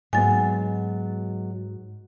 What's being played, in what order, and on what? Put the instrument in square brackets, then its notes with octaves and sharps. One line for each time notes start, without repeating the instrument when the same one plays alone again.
[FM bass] G#2 [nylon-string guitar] F#3 G#3 B3 [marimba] G#5 A6